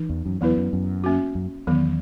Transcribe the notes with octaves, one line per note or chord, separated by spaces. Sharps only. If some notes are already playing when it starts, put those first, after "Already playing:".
Already playing: E3 D#4
E2
F#2
E2 F#3 B3 E4 B4
F#2
F#2
A#3 C#4 F#4
F#2
E2 D#3 F#3 B3